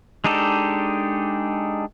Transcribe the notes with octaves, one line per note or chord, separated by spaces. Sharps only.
G#3 D4 D#4 G4 A4